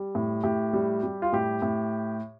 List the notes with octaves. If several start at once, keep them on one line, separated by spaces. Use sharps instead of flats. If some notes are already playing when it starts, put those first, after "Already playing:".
Already playing: G3
A2
A2 G4
G3
G3
F4
A2 G4
A2